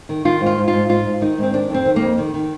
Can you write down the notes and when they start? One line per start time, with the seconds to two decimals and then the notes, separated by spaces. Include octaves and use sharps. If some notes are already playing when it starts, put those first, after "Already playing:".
0.09 D#3
0.25 D#3 F4
0.41 G#2
0.46 F4
0.58 G#2
0.68 F4
0.73 G#2
0.89 G#2 F4
1.05 G#2
1.21 D#3 D#4
1.38 G#2 C4
1.54 D#3 D4
1.70 F2 C4
1.86 D#3
1.96 A#3
2.02 F2
2.18 D#3
2.34 D#3